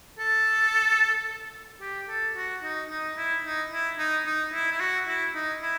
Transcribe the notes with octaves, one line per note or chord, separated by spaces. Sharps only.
A4
G4
A4
F#4
D#4
D#4
E4
D#4
E4
D#4
D#4
E4
E4
F#4
E4
D#4
E4